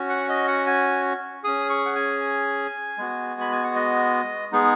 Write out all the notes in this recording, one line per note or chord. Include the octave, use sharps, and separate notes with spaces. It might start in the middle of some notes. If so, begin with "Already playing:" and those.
Already playing: C#4 F#4
F#5
D#5
F#5
G#5
C#4 G#4 D#6
C#6
F#5
G#5
G#3 B3 F#4
B5
G#5
F#5
D#5
G#3 B3 D#4 G#4